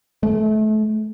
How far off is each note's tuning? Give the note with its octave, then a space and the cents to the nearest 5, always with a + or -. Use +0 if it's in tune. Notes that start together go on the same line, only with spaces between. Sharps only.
A3 -30